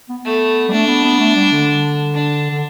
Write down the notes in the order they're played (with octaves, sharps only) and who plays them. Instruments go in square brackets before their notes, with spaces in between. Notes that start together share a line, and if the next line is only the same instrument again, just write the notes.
[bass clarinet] B3
[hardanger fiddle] A3 [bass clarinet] B3
[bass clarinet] G3
[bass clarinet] A3 [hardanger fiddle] D4
[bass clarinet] B3
B3
A3
G3
D3
[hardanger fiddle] D4
[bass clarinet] D3